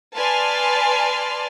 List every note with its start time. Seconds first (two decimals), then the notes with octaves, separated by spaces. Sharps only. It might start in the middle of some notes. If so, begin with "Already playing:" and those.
0.15 B4 D5 G#5 A5 C6 F6